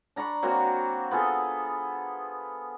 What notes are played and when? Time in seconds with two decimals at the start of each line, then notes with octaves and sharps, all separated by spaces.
0.16 D4 A#5 B5 C#6
0.43 F#3 A#3 C4 F#4
1.11 B3 F4 G#4 A4